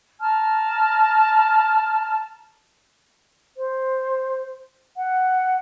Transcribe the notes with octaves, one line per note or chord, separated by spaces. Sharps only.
A5 A#5 F6
C5
F#5